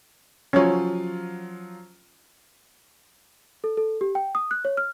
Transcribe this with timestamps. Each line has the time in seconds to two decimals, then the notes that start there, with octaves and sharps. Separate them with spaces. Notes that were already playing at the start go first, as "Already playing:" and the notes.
0.53 F3 F#3 C#4 F4 C#5
3.64 A4
3.77 A4
4.01 G4
4.15 G5
4.35 D#6
4.51 F#6
4.65 C#5
4.77 F6